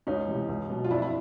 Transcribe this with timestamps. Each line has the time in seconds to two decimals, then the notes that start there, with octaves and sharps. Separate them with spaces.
0.07 C#2 C#4 D#4
0.28 C3 E3
0.48 C#2
0.70 B2 F#3
0.84 F4
0.90 F2 D4 E4
1.02 E4